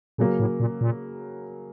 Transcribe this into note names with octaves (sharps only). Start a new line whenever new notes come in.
A#2 C#3 F#3 A#3
A2
A#2
A#2